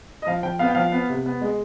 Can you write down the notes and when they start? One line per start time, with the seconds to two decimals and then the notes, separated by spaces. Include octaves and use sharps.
0.22 D#5
0.27 F3 F5
0.43 F3 G5
0.59 B3 F5
0.68 G5
0.75 F3 F5
0.92 B3
1.10 C3
1.26 B3
1.41 G#3